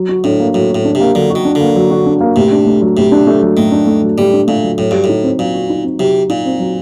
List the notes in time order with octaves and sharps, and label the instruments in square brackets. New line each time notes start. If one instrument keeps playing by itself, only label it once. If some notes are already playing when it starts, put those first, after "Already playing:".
Already playing: [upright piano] F#3
F#4
[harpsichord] A2 [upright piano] D4
[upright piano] A#3
[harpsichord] A2 [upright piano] F#3
[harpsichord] A2 [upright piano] F#4
[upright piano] D4
[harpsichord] C3
[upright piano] A#3
[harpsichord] D3 [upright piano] F#3
[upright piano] F#4
[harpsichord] D#3
[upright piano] D4
[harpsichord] D3
[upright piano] A#3
F#3
F#4
D4
A#3
[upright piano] A2 [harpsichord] C3
[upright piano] D4
A3
F#3
[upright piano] A2 [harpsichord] C3
[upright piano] D4
A3
F#3
[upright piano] A2 [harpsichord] D#3
[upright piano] D4
A3
F#3
[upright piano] A2 [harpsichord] G3
[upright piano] D4
[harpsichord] A#2 [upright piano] A3
[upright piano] F#3
[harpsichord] A2 [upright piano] F#3
[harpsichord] G2 [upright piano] F#4
[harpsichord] A2
[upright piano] D#4
C4
[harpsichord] A#2 [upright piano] F#3
[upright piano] F#4
D#4
C4
[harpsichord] C3 [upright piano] F#3
[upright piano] F#4
[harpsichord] A#2 [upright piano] D#4
[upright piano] C4
F#3